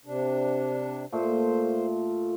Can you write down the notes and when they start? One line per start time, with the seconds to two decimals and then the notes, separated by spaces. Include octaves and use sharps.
0.06 C3 D4
1.12 A#2 A3 C5